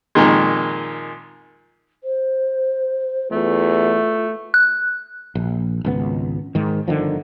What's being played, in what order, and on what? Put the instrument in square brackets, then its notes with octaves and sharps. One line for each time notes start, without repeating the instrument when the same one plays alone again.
[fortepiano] F2 A#2 D#3 G#3
[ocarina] C5
[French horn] E2 [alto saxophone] A3 [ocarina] F4
[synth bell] F#6
[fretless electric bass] A#1
G#1 C#2 B3
G#2 D#3
G1 D3 D#3 F3